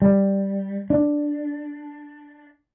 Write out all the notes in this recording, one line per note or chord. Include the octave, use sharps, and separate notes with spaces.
G3
D4